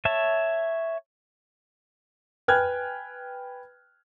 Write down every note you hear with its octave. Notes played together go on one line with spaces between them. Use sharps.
C#5 E5 A5
B4 G5 G#5 F6 F#6 G#6